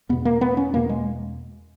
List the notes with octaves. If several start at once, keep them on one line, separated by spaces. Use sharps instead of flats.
E2 B2 B3
A#3
B3
C#4
E2 B2 A#3
G#3